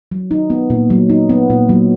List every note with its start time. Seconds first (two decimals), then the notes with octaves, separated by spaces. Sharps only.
0.12 F#3
0.31 D#4
0.50 B3
0.70 A#2
0.90 F#3
1.10 D#4
1.29 B3
1.50 A#2
1.69 F#3